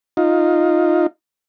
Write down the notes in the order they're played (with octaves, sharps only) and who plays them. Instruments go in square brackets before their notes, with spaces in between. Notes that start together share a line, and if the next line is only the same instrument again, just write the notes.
[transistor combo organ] D#4 F4